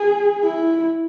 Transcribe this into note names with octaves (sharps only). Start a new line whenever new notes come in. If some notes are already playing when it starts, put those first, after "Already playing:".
Already playing: G#4
E4